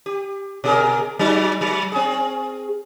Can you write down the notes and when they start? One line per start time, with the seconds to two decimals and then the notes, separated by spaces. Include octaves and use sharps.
0.06 G4
0.64 B2 G#4 A#4
1.19 F#3 D#4 F#4
1.61 F#3
1.92 C4 G#4